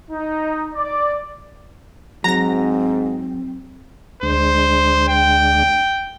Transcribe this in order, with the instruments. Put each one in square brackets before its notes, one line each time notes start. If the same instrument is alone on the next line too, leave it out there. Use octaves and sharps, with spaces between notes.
[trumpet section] D#4
D5
[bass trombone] G#2 [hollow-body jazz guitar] F#3 [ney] C4 [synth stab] A#5 A#6
[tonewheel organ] D2 G#3 D4 [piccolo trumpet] C5
[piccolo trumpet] G5